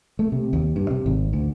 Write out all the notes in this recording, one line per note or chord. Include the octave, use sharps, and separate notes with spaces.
A3
C3
D#2
G2
C3
G#1
D2